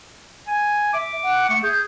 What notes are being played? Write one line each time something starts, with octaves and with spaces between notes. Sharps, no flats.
G#5
E5 D6
F#5
A3 C#7
G#4 G6